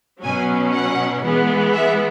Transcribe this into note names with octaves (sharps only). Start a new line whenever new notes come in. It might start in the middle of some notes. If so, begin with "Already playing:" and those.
B2 F#3 C#4 G#5
F#5
E3 G#3 B3
E5